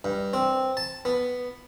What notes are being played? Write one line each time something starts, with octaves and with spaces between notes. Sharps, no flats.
G2
C4
A5
B3